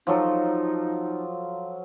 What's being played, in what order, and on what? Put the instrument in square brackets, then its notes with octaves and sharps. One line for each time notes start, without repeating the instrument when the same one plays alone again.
[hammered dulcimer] F3 F#3 A4 [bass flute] D#4